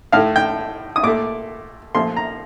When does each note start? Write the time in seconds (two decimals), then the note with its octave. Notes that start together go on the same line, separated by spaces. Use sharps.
0.12 A2 A3 F5
0.36 G5
0.96 D#6
1.03 A#2 A3 D6
1.94 A#2 F3 A3 C6
2.16 A#5